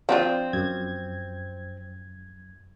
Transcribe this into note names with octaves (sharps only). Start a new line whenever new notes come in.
F3 C4 D4 F4
F#2 G#6